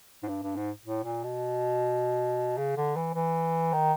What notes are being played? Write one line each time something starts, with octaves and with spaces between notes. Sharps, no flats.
G#2
G2
G2
G#2
A2
A#2
B2
C#3
D3
E3
E3
D#3